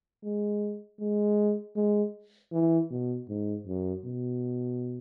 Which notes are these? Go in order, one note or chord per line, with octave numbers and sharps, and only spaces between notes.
G#3
G#3
G#3
E3
B2
G#2
F#2
B2